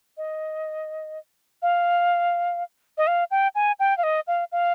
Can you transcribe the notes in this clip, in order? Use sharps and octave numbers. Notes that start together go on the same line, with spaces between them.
D#5
F5
D#5
F5
G5
G#5
G5
F5
D#5
F5
F5